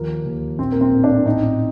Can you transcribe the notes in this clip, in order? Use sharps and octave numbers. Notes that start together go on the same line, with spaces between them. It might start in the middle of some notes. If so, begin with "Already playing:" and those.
Already playing: D#2 F3 A#3
D#2
A#1 C4
A#3
C4
A2
A#3 D4
A1 C4 D#4